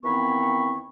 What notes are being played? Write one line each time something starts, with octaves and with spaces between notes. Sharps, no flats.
D#2 E3 B3 C4 B5 C#6